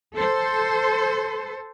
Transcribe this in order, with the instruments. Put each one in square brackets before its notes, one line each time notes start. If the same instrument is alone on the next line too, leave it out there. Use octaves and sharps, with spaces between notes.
[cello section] A4 C5